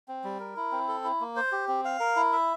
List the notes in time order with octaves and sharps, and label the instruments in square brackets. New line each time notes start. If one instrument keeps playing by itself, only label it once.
[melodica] C4
G3
A#4
E4
C4
A4
E4
A#3
C5
G4
C4
F5
A#4
E4
E5